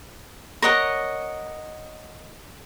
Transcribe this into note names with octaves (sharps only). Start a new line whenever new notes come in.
A#4 C#5 D#5 F#5